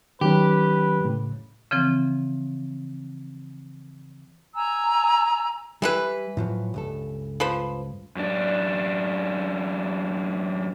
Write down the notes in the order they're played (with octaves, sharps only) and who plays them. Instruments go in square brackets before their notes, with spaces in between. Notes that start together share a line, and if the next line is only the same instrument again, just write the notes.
[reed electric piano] D#3 F#3 C#4 [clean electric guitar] G4 [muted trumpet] B4
[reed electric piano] A2 C#3
[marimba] C#3 E3 F3 C4
[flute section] G#5 A#5 E6
[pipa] E3 E4 B4 [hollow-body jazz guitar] G3
[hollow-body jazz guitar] A2 F3 F#3
C#2 G2 A4
[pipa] F3 B4 C5
[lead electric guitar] F#2 D4